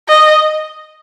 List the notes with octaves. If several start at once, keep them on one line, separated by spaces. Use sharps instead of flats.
D#5